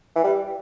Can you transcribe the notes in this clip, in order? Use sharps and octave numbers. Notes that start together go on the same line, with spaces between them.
E3
G3